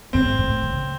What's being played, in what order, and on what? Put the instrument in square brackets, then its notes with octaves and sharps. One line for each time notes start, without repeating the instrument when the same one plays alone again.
[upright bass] G#2 [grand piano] C4
[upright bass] A2
C#3